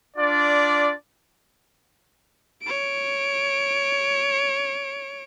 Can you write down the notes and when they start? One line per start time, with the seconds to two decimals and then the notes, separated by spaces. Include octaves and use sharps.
0.17 D4 F4 D5
2.62 C#5 D7